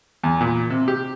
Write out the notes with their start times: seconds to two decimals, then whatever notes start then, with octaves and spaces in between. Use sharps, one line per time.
0.24 E2
0.41 A#2
0.70 C3
0.88 G4